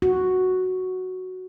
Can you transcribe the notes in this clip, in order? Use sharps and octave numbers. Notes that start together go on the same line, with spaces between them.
F#4